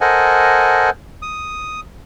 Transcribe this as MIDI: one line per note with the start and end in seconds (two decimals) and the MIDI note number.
0.01 0.90 69
0.01 0.90 70
0.01 0.90 72
0.01 0.90 75
0.01 0.90 78
0.01 0.90 80
1.22 1.80 87